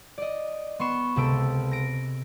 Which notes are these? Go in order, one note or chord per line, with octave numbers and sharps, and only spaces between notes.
D5 D#5
B3 C6 C#6 E7
C#2 C3 A4 E6 D7
A#6 D7